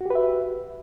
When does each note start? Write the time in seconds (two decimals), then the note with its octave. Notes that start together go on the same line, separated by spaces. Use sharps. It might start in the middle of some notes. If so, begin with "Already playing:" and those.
0.01 F#4
0.06 G4
0.10 B4
0.15 E5